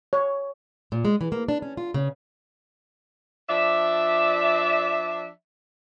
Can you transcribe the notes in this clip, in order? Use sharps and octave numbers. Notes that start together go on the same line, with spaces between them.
C#5
A#2
G#3
E3
A#3
D4
C#4
F4
C#3
F3 D4 D5 E5